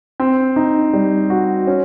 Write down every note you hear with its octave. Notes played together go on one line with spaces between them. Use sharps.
C4
D#4
G3
F#4
C#4